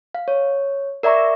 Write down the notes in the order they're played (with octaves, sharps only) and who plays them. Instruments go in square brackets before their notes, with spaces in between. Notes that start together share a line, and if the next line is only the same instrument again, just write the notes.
[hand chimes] F5
C#5
A#4 D5 E5 A#5 C#6